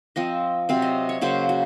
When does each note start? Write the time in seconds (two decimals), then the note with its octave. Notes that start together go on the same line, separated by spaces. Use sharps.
0.16 F3 C4 D#5
0.69 C3 F#3 C4 F5
0.82 D#5
1.09 C#5
1.21 C#3 F#3 A#3 C5
1.49 F#4